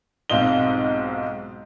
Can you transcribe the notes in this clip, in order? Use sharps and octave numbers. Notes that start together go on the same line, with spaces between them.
B1 G#2 C4 F4 D#5 G7